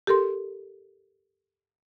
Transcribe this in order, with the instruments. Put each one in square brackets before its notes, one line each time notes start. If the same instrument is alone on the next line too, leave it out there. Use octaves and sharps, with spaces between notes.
[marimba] G4 A4 A#4 C6